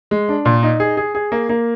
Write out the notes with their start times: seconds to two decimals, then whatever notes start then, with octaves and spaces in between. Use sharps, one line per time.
0.11 G#3
0.29 D4
0.45 A#2
0.63 D#4
0.80 G#4
0.97 G#4
1.15 G#4
1.32 A#3
1.49 A#3